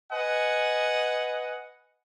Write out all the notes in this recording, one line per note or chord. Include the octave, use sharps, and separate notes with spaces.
B4 D#5 F#5 G#5